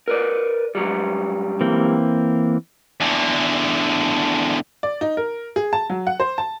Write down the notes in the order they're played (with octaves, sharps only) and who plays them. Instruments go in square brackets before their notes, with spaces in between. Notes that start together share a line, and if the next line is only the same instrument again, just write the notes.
[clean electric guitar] A#4 B4 D5
G#2 F#3 G3
[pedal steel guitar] E3 A#3 C4
[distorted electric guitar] E2 D3
[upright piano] D5
D#4
A#4
G#4
A5
F#3
F#5
C5
A5